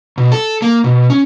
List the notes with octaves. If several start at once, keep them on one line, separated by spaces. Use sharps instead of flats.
B2
A4
A#3
B2
C#4